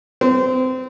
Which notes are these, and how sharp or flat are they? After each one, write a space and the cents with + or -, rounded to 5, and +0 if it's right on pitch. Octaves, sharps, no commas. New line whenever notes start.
C4 -25